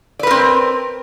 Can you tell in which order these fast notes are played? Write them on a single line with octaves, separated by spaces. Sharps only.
D5 B4 A#4 C4